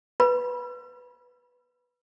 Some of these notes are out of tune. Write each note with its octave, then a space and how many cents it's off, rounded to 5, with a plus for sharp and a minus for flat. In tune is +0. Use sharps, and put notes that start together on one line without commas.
B4 +0 B5 -30